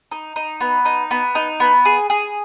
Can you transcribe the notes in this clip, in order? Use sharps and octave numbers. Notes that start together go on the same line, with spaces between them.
D#4
D#4
B3
D#4
B3
D#4
B3
G#4
G#4